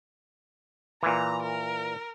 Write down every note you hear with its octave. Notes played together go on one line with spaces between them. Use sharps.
A#2 E3 A#5
A#4